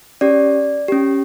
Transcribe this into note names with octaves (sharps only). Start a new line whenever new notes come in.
C#4 G4 D5
C#4 G4